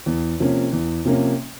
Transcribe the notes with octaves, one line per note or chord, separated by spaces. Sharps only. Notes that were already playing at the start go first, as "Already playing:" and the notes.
E2
C3 F3 A#3 C#4
E2
C3 F3 A#3 C#4